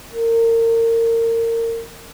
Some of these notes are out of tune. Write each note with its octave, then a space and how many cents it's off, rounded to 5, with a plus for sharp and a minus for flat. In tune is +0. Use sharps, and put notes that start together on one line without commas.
A#4 -30